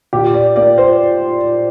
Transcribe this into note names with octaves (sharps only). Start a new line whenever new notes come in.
A#2 G4
D5
A#3 D5
C5